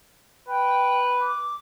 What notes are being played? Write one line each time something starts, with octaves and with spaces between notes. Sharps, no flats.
B4 G5
D6